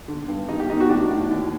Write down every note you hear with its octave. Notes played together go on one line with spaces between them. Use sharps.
D3
G2
D#3 D#4
G4
D#3 D#4
F#4
A2 D4
A2
D#2